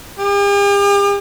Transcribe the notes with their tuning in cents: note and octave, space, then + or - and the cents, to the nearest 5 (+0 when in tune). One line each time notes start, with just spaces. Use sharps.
G4 +45